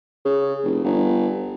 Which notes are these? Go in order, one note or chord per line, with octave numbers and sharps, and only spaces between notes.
C#3
F1
G1